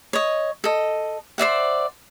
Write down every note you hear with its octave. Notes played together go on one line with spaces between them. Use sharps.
C#5 D#5
A4 D#5
C5 D5 E5 F#5